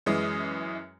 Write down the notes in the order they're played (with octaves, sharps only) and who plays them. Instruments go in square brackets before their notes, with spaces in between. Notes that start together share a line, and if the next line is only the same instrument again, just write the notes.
[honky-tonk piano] F#2 E3 G#3 D#6